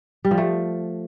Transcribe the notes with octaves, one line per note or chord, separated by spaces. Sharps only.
G3
F3
A3